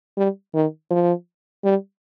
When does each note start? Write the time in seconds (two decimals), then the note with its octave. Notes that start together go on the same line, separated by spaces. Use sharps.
0.17 G3
0.54 D#3
0.91 F3
1.64 G3